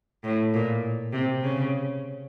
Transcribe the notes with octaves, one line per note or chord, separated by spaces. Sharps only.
A2
A#2
C3
C#3